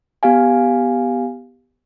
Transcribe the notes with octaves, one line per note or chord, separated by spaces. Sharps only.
B3 G4 F5 G#5